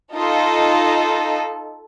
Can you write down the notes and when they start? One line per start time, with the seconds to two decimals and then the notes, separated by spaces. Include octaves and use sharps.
0.14 D#4 F4 A4 D#5